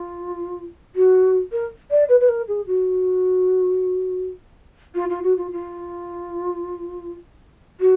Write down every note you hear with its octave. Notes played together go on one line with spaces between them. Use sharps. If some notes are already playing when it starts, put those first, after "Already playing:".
Already playing: F4
F#4
A#4
D5
B4
B4
A#4
G#4
F#4
F4
F4
F#4
F4
F4
F#4